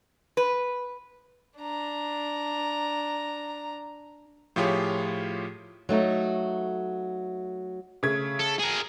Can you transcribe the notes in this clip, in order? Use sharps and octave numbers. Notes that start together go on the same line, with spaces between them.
B4
D4 A#5
A2 F3 F4 G4 G#4 C#5
F#3 A3 D#4
C#3 A3 G#6
A4
G#4 A#4